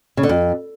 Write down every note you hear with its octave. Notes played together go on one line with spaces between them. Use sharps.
C#3
D3
F2